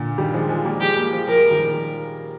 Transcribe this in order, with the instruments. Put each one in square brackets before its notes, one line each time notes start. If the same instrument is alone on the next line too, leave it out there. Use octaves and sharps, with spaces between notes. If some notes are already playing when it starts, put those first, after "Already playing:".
Already playing: [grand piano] A#2 D3
D#3 G3
F3 G#3
F3 G#3
G3 A#3
[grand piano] F3 G#3 [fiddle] G4
[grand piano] G3 A#3
F3 G#3
[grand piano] F3 G#3 [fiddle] A#4
[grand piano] D#3 G3